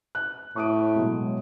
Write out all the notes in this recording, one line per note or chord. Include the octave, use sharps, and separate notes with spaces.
F#6
A2 C#6 D#6 D7
B2 F#3 G#3